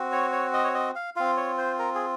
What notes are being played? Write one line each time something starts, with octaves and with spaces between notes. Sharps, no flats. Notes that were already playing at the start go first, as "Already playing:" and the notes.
Already playing: C4 F#4
C#5
C#5
D#5
C#5
D#5
F5
C4 F4 F5
C#5
C5
A#4
G#4